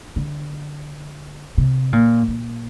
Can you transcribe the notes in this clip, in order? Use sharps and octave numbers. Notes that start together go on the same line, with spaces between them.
D3
C3
A#2
A#2